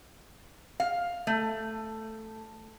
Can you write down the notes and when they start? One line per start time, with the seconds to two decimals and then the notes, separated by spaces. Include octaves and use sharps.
0.80 F5
1.27 A3